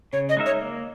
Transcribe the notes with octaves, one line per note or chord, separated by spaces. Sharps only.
C#3 C#5
D#5
G#3 D#4 A#4 E5
C#5
A#3